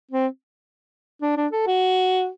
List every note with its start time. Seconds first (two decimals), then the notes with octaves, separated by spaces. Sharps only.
0.11 C4
1.22 D4
1.37 D4
1.52 A4
1.67 F#4